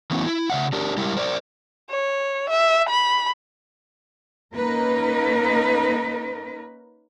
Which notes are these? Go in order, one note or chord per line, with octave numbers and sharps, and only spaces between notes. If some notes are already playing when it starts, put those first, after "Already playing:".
E3 F#3 A3 B3 C#4 E4
E4
C#3 E5 F#5
D4 G4 A#4
G3 G#3 E4 G4 A#4 E5
A#4 C5 D5
C#5
E5
B5
A#3 C#4 D#4 A#4 B4